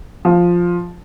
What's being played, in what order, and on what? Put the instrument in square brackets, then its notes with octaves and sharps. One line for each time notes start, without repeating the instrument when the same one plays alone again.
[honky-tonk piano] F3